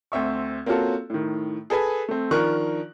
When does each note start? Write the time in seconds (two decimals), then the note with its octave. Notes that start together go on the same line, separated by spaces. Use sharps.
0.12 D2 C4 E5 C#6
0.66 A#3 C4 C#4 F4 F#4 A4
1.10 A2 D#3
1.70 G#4 A4 B4 G#5
2.09 A3 C4
2.31 D#3 F3 D4 A#4 C#6 F#6